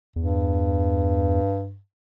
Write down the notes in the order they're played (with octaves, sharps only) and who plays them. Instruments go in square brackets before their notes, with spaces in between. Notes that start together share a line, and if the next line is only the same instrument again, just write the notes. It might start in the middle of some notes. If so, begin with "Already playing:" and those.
[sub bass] E2 [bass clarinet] G2